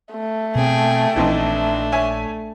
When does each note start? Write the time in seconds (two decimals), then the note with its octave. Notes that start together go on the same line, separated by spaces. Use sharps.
0.14 A3
0.55 B2 C4 G#4 G5
1.16 A#1 E3 C4 D4 D#4
1.92 C#5 E5 G#5